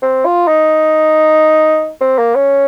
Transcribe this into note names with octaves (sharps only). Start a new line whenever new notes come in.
C4
F4
D#4
C4
A#3
C#4